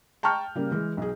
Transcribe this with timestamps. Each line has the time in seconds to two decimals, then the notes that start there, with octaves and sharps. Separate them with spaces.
0.23 G5 A5 A#5 C#6 F6 G6
0.55 C#3 G3 A#3
0.71 E3 G#3
0.97 B1 G#4